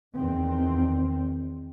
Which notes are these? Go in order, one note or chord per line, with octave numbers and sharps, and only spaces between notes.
E2 D#3 C4